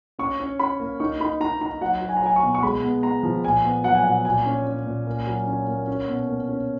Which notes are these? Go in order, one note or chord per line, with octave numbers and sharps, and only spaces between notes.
C#4 C#6
C#4
C#4 B5
A#3
D#4 C#6
D#4 B5
D#4 A#5
D#4 A#5
F#3 F#5
F#3
G#5
A#5
F#3 G#5
C#6
B2
C#6
G#3 B5
B3
B3 A#5
F3
A#2 G#5
B3
F#3 F#5
G#5
A#2 F#5
A#2 G#5
C#4
C#4
A#2
A#3
F#3
C#4
A#3
C#4
B2
A#3
C#4